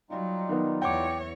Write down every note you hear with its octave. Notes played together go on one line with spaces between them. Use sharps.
F#3 G3 D#4 F4
D#3 B3
E2 C#5 F#5 G5 D6